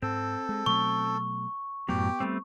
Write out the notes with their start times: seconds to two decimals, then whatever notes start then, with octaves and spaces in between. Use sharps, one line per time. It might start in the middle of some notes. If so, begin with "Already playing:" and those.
0.02 G#2 C4 A4
0.49 G#3
0.66 B2 F#3 A3 C#6
1.89 F#2 A2 F#3 B3 G4 G5
2.20 G3 A3 C4